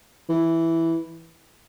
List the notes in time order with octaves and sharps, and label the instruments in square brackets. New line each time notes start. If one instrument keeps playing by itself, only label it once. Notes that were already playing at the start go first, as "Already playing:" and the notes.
[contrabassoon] E3